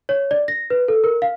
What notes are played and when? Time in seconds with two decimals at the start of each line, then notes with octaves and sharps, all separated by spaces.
0.09 C#5
0.31 D5
0.48 A#6
0.70 B4
0.88 A4
1.04 A#4
1.22 F5